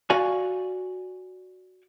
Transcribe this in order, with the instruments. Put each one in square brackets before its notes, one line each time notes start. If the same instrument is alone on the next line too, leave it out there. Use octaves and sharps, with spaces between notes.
[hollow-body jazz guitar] F#4 D5 F5 G#5